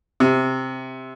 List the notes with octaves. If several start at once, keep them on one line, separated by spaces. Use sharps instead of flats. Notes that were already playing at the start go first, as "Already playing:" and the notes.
C3